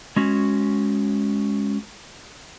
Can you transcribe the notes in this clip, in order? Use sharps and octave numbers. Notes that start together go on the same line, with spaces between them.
G#3 C#4 F#4